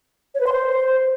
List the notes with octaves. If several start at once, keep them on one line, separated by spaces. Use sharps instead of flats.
C#5
B4
C6
C5